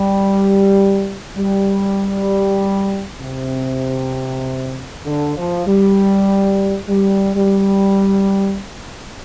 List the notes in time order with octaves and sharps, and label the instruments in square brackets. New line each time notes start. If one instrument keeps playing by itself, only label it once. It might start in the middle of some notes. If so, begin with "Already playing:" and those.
Already playing: [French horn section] G3
G3
C3
D3
F3
G3
G3
G3